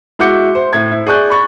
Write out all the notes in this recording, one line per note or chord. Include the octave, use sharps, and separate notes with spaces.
G#3 E4 F#4 D6 G6 C#7
C5
A2 G#6
E4
G#4 D5 C#6 F#6 G6
B5 C#6 A6